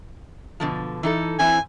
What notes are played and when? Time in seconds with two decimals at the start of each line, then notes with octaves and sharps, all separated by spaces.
0.60 B2 D3 F3
1.03 E3 D#4 A4
1.39 E3 C4 E4 G#5